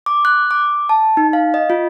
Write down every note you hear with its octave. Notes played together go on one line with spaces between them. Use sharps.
D6
F#6
D6
A5
D#4
F5
D#5
F4